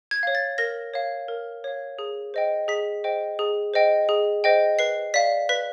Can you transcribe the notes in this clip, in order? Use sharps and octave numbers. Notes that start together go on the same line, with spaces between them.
G#6
C#5 F5
A6
A#4 A#6
C#5 F5
A#4
C#5 F5
G#4
C5 D#5 G5
G#4 B6
C5 D#5 G5
G#4
C5 D#5 G5
G#4
C5 D#5 G5
B4 C7
D5 F5 B6
B4 B6